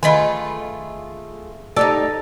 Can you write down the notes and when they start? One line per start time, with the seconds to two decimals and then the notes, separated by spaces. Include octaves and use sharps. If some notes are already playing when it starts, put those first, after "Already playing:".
0.03 D#3 A3 F4 G#4 D#5 B5
1.76 D#4 G4 A4 D5